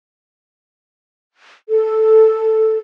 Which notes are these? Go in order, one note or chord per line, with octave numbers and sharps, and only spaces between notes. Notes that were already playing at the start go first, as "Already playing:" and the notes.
A4